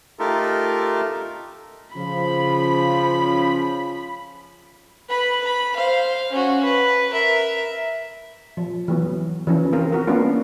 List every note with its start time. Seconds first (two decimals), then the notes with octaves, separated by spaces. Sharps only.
0.19 A3 D#4 F4 G4 A4 A#4
1.96 C#3 F3 B5
5.10 B4 B5
5.45 B5
5.76 C5 F5
6.32 C#4 F#4
6.64 B4
7.10 A#4 E5
8.57 F3
8.88 E3 F#3 B3
9.47 E3 F3 C#4
9.73 C4 F4 A#4
9.92 F#4 A#4
10.07 A#3 B3 C#4 D4 F4